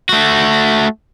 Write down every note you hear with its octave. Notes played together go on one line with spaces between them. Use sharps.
A3 F#4